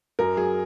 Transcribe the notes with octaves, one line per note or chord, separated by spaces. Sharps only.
F#2 A#4
F#3 G#4